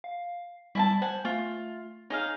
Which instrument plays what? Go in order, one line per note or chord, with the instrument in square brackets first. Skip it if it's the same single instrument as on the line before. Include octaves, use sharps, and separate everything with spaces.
[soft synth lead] F5
[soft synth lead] G3 [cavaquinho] E4 G#5 A5
[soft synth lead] C5 [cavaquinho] F#5 G#5
[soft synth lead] A3 [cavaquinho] F4
[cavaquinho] D#4 G#4 F5 [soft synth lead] C#5